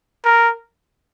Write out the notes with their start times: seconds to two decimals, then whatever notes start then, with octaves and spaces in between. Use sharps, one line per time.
0.25 A#4